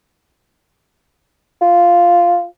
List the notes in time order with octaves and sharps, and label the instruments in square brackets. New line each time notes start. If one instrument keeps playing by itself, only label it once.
[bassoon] F4